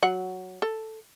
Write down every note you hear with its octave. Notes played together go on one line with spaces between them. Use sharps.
F#3 F#5
A4